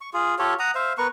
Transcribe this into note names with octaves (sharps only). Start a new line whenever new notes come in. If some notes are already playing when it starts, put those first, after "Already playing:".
C#6
F4 G#4
F4 G4 A4 C#5
F#5 A#5 D#6
C5 E5 F5
B3 A#4 B4 C#6